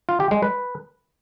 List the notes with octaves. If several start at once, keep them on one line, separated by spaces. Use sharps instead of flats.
F4
G4
G#3
B4